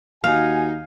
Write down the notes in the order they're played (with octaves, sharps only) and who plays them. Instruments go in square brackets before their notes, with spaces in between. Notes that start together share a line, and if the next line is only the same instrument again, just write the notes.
[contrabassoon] D#2 [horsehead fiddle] D#4 [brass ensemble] F#4 G#5 [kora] F5